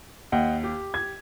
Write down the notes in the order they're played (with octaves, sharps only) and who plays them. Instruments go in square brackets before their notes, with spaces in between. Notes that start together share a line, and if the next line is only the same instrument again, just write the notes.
[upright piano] D#2 [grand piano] D#5 F#5 G5
[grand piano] G4
[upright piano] G#6